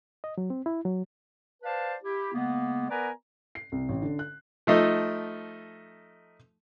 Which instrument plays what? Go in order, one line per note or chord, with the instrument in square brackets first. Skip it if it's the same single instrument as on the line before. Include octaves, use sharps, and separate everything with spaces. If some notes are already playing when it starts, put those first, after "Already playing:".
[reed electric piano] D#5
F#3
C4
E4
F#3
[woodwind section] B4 C5 D5 F5 A5
E4 G4
C#3 G#3 A#3 B3
B3 A#4 B4 D5 G#5 A#5
[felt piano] C7
C2
A1
D3
F#6
[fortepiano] F3 A3 D#4